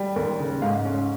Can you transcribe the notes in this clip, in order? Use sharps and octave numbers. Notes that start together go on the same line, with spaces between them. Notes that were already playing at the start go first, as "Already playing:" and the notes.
Already playing: G3
D#2
C#3
G#2 F5
C#4